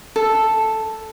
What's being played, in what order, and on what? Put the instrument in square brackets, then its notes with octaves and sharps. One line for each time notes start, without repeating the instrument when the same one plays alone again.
[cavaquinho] A4